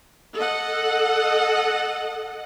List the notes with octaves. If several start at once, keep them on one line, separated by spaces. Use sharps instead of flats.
A4 D#5 F#5